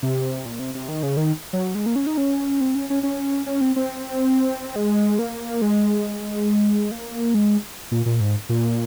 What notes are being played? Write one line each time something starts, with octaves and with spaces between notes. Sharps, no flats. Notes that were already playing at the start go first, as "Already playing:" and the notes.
C3
A#2
C3
C3
D#3
C#3
D#3
F#3
G#3
A#3
C#4
D#4
C#4
C4
C#4
C#4
C#4
C#4
C4
C4
G#3
A#3
G#3
A#3
G#3
A#2
A#2
G#2
A#2